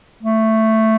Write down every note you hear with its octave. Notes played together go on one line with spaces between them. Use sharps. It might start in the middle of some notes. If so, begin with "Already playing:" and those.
A3